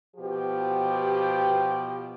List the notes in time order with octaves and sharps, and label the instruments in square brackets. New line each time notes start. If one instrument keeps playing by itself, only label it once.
[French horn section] B2 F3 G4